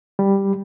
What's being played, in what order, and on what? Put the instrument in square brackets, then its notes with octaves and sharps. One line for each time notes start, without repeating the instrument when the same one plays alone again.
[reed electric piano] G3